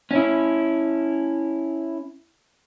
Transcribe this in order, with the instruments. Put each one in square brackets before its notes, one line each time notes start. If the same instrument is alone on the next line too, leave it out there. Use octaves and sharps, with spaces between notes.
[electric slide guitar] C#4 E4